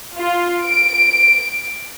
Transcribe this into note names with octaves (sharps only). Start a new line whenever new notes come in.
F4
D7